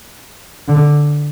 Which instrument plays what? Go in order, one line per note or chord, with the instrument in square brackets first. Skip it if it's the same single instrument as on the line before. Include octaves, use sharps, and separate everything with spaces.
[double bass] D3